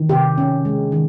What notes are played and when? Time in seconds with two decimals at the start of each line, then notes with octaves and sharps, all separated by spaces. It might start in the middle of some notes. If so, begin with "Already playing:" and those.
Already playing: D#3
0.09 C3 G4
0.38 C#4
0.65 G#3
0.92 D#3